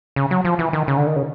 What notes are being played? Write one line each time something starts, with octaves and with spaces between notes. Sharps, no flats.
C#3
F#3
F3
E3
D#3
C#3
D3
D#3
C#3